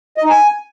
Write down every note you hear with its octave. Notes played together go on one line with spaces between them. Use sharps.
D#5
D#4
G#5